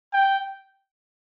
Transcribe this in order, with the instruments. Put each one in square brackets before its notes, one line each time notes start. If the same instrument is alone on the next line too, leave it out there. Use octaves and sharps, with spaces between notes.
[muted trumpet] G5